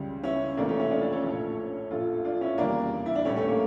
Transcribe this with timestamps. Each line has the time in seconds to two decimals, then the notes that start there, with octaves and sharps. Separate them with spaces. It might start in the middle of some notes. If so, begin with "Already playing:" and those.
Already playing: C#2 C#3 G3
0.23 C#4 E4
0.57 F1 F2 E3 A3 A#3 D4
0.68 A3 C#4
0.80 C#4 E4
0.90 D4 F4
1.01 D4 F4
1.12 A4 C#5
1.24 A#1 A2 F3 A3
1.91 A#1 A2 F3 F4 A4
2.25 D4 F4
2.41 C#4 E4
2.58 F1 E2 C#3 G3 A#3 D4
3.06 E4
3.15 D4
3.25 A#1 A2 G3 A3 C#4
3.36 A3 C#4
3.47 A#3